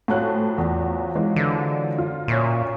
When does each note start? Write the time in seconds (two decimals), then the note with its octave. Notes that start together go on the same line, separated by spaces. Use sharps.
0.08 A2 F3 F#3 G#5 A5 F#6
0.58 E2
1.15 E3 G#3
1.36 D3
1.98 F4
2.28 A#2 C#4 E5 C#6